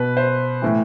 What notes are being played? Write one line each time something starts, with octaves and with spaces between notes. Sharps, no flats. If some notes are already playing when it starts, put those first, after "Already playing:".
Already playing: B2 B4
C5
A2 E3